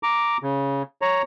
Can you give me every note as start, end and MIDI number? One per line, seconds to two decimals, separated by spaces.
0.03 0.37 82
0.03 0.37 86
0.43 0.83 49
1.02 1.22 73
1.02 1.22 82